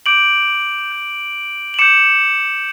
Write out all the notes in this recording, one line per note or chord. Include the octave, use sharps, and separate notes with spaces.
D6 G6 D7 F#7
D6 G6
F#7
D6 G6 C#7 E7